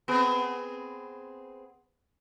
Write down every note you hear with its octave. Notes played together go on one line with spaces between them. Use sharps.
B3 C4 G#4